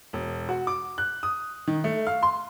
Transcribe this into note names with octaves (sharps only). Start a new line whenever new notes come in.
E1
F#4
D6
F#6
D#6
D#3
A3
F5
C6